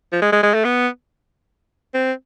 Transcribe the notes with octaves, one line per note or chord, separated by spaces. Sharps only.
F3
G#3
G#3
G#3
A3
B3
C4